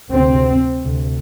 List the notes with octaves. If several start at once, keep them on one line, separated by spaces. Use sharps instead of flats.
D2 C3 C4
D2 C3